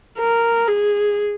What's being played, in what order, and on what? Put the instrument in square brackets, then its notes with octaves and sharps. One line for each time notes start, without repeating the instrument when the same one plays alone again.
[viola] A#4
G#4